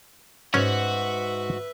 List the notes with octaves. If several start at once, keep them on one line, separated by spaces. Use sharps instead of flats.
G#2 C#4 F#4 B4 C#5 E5